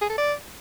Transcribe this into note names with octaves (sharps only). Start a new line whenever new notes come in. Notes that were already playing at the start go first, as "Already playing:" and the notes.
G#4
A4
D5